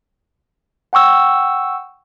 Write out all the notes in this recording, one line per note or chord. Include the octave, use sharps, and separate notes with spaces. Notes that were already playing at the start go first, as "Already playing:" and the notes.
F#5 G5 C#6 E6